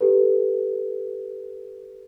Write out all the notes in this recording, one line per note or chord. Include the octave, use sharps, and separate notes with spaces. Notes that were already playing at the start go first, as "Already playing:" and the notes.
G4 A4 B4